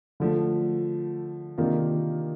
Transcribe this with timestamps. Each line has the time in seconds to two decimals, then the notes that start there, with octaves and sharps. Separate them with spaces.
0.20 D3 F3 A3
1.58 C3 D#3 A#3 D4 F4